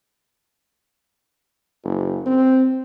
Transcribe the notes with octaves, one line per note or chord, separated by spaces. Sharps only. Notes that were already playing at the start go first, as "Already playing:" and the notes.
F#1
C4